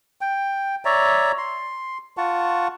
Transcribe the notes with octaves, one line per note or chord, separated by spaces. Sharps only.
G5
C#5 D5 E5 A#5
C6
F4 F#5 A5 C#6